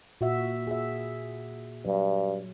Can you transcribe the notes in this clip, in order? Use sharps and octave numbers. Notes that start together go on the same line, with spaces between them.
A#2 F#4 E5
G#4 E5
G2 F#3